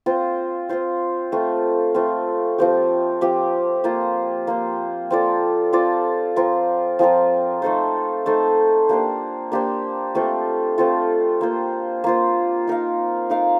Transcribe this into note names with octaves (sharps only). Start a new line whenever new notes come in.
C4 F4 C5
C4 F4 C5
A3 C4 F4
A3 C4 F4
F3 C4 G4
F3 C4 G4
A#3 F4 C5
A#3 F4 C5
C4 F4 A4 D5
C4 F4 A4 D5
F3 C4 F4 A#4
F3 C4 F4 A#4
A3 D#4 A4 C5
A3 D#4 A4 C5
A#3 D4 G4 C5
A#3 D4 G4 C5
A3 C4 F4 A4
A3 C4 F4 A4
A#3 F4 C5
A#3 F4 C5
D#4 A#4 F5
D#4 A#4 F5